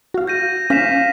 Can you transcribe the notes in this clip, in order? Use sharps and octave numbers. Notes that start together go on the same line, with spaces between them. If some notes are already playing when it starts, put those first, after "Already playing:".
F#4 F5
G6 A#6 D#7
C#4 F5 A#6 B6 E7